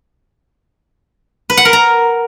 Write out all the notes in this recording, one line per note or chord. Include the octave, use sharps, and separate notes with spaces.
B4
F#5
A#4
A#5